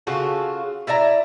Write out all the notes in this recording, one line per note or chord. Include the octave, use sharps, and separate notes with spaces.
C#3 F4 F#4 A4
E4 D5 E5 A#5